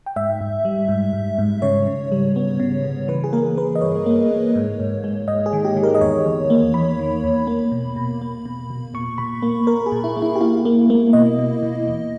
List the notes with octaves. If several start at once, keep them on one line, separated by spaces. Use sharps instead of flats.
G5
G#2 E5
G#2
G3
G#2
G#2
G#2
C#3 C#5
C#3
G3
B3
C#3
C#3
E3 B4
G#4
A#3 A#4
A#3 B4
D#5
G2 C#5
A#3
A#3
G#2
G#2
G#3
G#2 D#5
G#4
D#3
G4
D#3
A#4
D#5
E2 C#5
E2
A#3
E2 B5
D#3
E2
A#3
B2
B2
A#3
B2
B2
A#2 C#6
A#2 B5
A#3
A#3 A#4
G#4
A#2
E4
A#3
E4
G4
A#3 E4
A#3
A#3
B2 D#5
B2
B2
E2